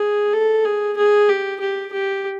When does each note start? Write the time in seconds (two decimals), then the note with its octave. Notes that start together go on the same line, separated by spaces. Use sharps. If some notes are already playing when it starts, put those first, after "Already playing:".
Already playing: G#4
0.33 A4
0.65 G#4
0.97 G#4
1.29 G4
1.60 G4
1.93 G4